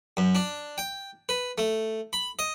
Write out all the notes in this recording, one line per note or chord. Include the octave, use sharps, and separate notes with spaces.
F#2
D4
G5
B4
A3
B5
D#5